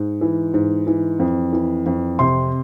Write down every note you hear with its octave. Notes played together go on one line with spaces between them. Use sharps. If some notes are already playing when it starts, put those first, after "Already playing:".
Already playing: G#2
E3
G#2
E3
F2
E3
F2
C3 C6